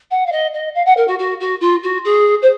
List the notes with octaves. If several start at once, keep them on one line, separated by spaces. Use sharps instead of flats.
F#5
F5
D#5
D#5
F5
F#5
A#4
F#4
F#4
F#4
F4
F#4
G#4
C5